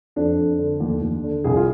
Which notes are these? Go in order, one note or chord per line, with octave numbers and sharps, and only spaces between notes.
F2 D4
F2
D3
D#2
D#2
D3
C2 G#4
F4